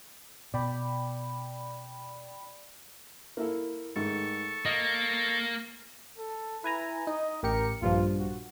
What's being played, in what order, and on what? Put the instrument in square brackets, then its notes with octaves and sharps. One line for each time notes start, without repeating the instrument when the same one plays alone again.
[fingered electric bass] B2 [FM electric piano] D5 G5 B5
[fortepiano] A#3 E4 A4
[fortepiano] G#2 D#3 A3 [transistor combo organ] A4 C#6
[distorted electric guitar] A#3 [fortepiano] D#5
[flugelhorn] A4
[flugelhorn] E4 [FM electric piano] B4 G#5 A#5
[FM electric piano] D#4 [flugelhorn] D#5
[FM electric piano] A1 G4 C#7 [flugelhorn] A#4
[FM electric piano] A#1 G2 F3 [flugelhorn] F4
[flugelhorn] F#4